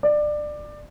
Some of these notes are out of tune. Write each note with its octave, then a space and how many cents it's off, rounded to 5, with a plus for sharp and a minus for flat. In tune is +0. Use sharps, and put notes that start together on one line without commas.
D5 +20